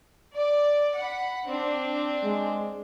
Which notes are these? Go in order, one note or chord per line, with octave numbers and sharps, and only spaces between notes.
D5
F#5 B5
C4 D4
G#3